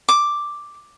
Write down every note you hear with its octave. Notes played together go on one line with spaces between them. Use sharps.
D6